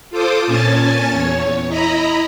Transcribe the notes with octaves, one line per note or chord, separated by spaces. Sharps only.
F4 A4 C5 D6 D#6
A#2 C#4 G#5 A5 A6
E2 C#5
E4 D#5 A#5 B5